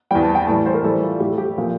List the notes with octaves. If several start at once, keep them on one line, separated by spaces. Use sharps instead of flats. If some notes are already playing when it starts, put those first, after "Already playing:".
E2 E3 G3 G5
A5
G5
A2 E3 G3 A5
C5
A#4
A2 E3 G3 A4
F4
A2 G3 G4
A4
G4
A#2 F3